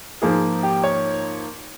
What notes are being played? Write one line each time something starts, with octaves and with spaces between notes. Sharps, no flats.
G#2 F3 A#3 G#4
G4
C#5